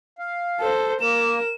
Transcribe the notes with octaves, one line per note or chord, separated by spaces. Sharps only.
F5
A4 C5
A#3 A#4 E7